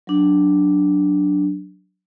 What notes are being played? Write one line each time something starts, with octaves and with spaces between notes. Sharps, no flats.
F#3 D4